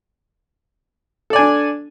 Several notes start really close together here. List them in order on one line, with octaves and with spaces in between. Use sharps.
A4 D5 G#5 D4